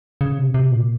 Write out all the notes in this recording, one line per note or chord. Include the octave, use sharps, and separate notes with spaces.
C#3
C3
C3
A#2